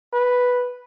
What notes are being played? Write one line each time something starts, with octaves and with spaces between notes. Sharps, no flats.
B4